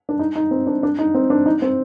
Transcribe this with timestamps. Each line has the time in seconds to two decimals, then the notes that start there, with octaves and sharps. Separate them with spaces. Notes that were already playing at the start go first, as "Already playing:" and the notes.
0.09 D4
0.19 D#4
0.36 D#4
0.51 C4
0.67 D4
0.83 D4
0.99 D#4
1.14 C4
1.30 D4
1.46 D#4
1.62 C4